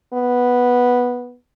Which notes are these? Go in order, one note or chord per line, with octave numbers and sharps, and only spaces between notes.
B3